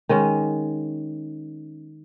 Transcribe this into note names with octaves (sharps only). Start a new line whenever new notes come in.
D#3 G#3 C#4